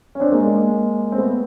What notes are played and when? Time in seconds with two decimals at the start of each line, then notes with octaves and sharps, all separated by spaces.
0.15 C#4
0.20 C4 D4
0.32 G#3 A#3
0.42 G#3 A#3
1.12 C4
1.18 A3 B3